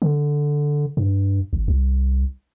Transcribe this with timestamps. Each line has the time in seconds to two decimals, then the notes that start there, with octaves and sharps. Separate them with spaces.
0.02 D3
0.97 G2
1.53 G#1
1.68 C2